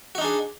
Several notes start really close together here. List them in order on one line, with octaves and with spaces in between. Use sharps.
F#4 D#4 D4 G#4